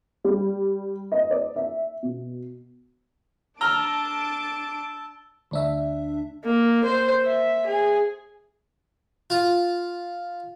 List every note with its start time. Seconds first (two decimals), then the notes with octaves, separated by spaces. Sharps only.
0.24 G3
1.12 D#5
1.31 D5
1.56 E5
2.03 B2
3.61 D4 A5 A#5 E6 F6 D7 G7
5.51 D2 D4 E5
6.45 A#3
6.84 C5
7.25 E5
7.67 G#4
9.30 F4